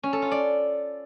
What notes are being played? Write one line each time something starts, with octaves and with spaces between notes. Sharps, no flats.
C#4
A4
F4
D5